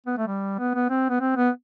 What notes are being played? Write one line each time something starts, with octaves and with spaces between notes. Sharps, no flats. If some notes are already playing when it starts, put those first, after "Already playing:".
B3
A3
G3
B3
B3
C4
B3
C4
B3